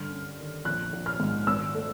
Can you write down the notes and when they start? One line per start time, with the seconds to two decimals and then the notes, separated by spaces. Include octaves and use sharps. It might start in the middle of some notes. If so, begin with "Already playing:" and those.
Already playing: G2 D3 F6
0.10 C#4
0.37 D#3
0.65 A#1 F#6
0.93 A#1
1.06 F6
1.20 G#2
1.47 G#1 E6
1.75 A3